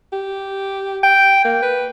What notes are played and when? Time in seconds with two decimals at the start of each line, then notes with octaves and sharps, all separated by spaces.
0.13 G4
1.04 G5
1.45 A#3
1.63 B4